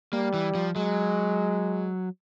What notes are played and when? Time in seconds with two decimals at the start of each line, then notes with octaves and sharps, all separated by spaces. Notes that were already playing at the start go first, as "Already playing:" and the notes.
0.13 G3 A#3
0.34 E3
0.55 F3
0.76 F#3 G#3